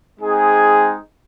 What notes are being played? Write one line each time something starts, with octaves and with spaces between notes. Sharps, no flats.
G#3 C4 D#4 G#4